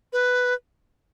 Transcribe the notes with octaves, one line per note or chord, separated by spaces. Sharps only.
B4